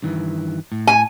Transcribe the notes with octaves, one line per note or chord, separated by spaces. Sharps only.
G2 D#3 E3
A2
G#5